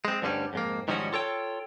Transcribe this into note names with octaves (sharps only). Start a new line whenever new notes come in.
G#3 C4
D2 G2 D3 G3 C#4
F2 G#2 A#3
G#2 D#3 F3 G3 C#4 F#4
F4 A4 C#5 G5